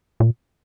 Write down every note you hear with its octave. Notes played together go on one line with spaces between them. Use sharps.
A#2